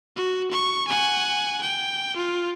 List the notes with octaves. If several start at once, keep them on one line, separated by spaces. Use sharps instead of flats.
F#4
C#6
F#5 G#5
G5
F4